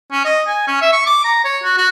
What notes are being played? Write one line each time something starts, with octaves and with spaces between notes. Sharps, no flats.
C#4
D#5
G#5
C#4
E5
C#6
D6
A#5
C#5
F#4
F#4